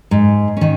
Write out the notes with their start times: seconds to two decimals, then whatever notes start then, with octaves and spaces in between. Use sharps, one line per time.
0.11 G#2
0.57 D#3 C#4